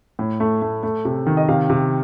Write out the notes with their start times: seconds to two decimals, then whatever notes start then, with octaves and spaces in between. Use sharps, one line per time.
0.19 A2
0.40 A3
0.62 A3
0.83 A3
1.05 C3
1.27 D#3
1.37 D#5
1.48 C3 F5
1.70 C3